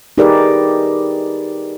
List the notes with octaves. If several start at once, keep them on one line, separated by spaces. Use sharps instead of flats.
D#4 G4 G#4 A#4 B4 D5